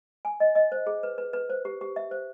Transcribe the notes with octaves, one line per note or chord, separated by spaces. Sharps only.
G#5
D#5
D#5
C5
G#4
B4
B4
B4
C5
G4
G4
E5
C5